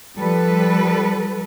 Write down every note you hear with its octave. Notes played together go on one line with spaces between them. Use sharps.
F3 G3 A4 B4